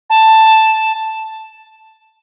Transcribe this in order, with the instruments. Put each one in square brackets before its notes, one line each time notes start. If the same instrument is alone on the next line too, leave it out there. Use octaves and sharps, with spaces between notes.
[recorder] A5